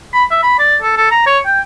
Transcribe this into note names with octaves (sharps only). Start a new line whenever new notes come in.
B5
E5
B5
D5
A4
A4
A#5
C#5
G5